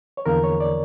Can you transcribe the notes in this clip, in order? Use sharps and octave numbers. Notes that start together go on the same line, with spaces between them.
C#5
E2 D3 F3 A#3 A#4
C#5
D5